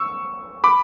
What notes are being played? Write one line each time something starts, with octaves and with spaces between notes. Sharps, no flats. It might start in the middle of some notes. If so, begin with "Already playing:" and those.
Already playing: C#6 E6
B5 D6